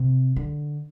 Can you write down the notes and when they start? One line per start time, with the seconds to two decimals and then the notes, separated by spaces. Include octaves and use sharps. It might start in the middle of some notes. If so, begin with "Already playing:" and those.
Already playing: C3
0.36 D3